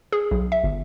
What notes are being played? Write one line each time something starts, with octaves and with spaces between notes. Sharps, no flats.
G#4
B1
E5
G1